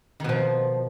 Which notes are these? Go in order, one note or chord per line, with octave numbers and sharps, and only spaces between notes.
B2 D#3 F3